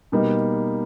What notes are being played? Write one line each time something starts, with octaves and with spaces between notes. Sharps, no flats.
B2 G3 A#3 D#4